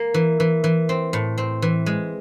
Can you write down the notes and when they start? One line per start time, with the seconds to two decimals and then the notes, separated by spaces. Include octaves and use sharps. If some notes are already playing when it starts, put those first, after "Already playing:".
Already playing: A#3
0.14 E3
0.40 E3
0.64 E3
0.89 C4
1.13 A2
1.38 C4
1.62 E3
1.86 G#3